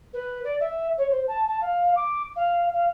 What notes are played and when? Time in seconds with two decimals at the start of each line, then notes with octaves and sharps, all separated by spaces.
0.13 B4
0.44 D5
0.60 E5
0.97 C#5
1.10 C5
1.27 A5
1.48 A5
1.61 F5
1.96 D6
2.36 F5
2.73 F5